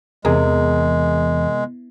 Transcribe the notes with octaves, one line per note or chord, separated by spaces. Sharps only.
E2 C3 G#3 G#4 A#4